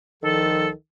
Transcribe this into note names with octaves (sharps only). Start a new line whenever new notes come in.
C2 D#3 F3 A4